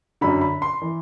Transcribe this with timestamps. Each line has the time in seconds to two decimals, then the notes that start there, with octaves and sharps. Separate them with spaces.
0.21 F#2 D3 B5
0.41 B5
0.62 C6
0.82 E3